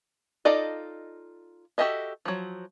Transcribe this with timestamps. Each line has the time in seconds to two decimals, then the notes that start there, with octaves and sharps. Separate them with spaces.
0.45 D#4 F4 A4 D5 D#5
1.78 F#4 G4 A4 D#5 E5
2.25 F3 F#3